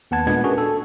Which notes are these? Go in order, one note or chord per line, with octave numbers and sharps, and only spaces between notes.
D#2 B3 F#5 A5 G#6
A#2 G#3 B3 D4 F#5 G#6
C#4 D4 F#4 G#4 A#4 B4
A4